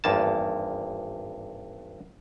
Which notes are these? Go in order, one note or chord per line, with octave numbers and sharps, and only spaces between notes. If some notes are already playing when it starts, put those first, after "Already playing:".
G#1 E2 G2 A#3 A5